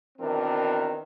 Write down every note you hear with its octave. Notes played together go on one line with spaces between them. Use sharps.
B2 D#3 E3 C4 D4 A#4